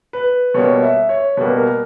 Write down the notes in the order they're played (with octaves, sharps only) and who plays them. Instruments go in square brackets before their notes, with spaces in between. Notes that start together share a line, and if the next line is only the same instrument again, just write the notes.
[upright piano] B4
B2 G3 A#3 C#5
E5
C#5
B2 G3 A#3 B4
A#4